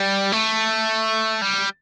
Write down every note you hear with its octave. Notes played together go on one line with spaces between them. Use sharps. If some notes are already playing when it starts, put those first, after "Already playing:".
Already playing: G3
A3
G3